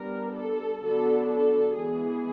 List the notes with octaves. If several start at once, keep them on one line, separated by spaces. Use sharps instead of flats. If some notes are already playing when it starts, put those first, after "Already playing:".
Already playing: G3 B3 D4 A#4
A4
D3 F#3 B3 D4 A4
A4
E3 G#3 B3 G#4